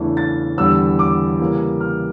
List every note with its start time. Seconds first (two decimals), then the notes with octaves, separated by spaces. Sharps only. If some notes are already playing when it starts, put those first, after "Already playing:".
Already playing: E2 C#3 E3 A3 D4
0.17 A6
0.58 E2 D3 G3 E6
0.99 D6
1.40 C#3 E3 G3 A#3
1.81 F6